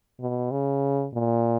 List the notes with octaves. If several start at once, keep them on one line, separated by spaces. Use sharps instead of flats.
B2
C#3
A#2